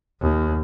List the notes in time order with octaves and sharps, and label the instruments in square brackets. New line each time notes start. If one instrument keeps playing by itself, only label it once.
[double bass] D#2